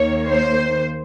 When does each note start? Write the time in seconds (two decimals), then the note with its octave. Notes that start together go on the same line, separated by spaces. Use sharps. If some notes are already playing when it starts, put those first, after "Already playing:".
Already playing: D#2 D#3 A#3 C#5
0.27 C5